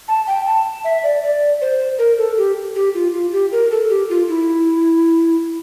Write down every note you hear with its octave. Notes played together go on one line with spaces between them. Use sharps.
A5
G5
A5
E5
D5
D5
C5
A#4
A4
G4
G4
F4
F4
G4
A#4
A4
G4
F4
E4